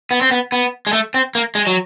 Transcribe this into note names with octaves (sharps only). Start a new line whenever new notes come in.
B3
C4
B3
B3
G#3
A3
C4
A#3
G#3
F#3